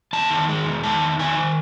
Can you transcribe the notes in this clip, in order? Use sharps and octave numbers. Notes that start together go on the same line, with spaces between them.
E2 A5
D#3
G#3
E2
D#3 A5
E2
D#3 G#5
D#3